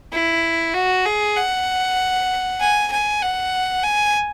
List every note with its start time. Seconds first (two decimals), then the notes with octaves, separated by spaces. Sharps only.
0.13 E4
0.74 F#4
1.06 G#4
1.37 F#5
2.60 G#5
2.91 G#5
3.22 F#5
3.84 G#5